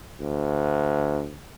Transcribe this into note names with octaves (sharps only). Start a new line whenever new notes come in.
D2